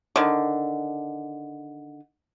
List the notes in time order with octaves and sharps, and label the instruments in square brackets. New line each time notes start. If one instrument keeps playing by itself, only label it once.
[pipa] D3 D#3